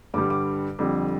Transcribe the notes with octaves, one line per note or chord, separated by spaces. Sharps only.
G2 D3 G3 D6
D6
F2 D3 G3